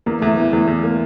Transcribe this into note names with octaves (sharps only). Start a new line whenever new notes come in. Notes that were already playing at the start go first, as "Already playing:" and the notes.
E2 A#3
E2 A3
E3 A3
E2 A3
E2
A#3